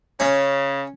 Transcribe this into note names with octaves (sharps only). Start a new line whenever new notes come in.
C#3 C#4